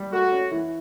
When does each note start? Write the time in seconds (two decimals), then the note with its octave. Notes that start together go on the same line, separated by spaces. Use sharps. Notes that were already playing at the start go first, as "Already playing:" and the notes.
Already playing: G3
0.12 A3 F#4
0.32 C#4
0.51 E3